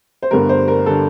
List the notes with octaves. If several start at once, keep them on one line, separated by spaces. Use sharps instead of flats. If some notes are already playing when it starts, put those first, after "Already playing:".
C5
G1 G2 D3 G3 A#4
C5
A#4
D3 G3 A4